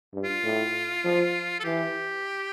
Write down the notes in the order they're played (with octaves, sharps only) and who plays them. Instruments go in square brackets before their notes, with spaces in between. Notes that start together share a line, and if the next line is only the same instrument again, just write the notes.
[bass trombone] G2
[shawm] F4
[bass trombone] A2
F3
[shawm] A4
[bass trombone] E3 [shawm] G4